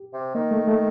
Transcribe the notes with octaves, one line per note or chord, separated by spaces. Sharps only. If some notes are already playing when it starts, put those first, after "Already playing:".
Already playing: G4
C3
D#3 A#3
A3
A3